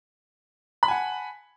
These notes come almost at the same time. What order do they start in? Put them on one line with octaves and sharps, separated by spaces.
B5 A5 G#5 F#5